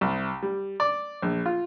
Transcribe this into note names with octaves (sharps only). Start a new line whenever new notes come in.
C2
G3
D5
A#1
F4